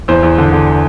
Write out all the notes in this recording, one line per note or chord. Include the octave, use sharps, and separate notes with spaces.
E2 C5
E2
D3
D3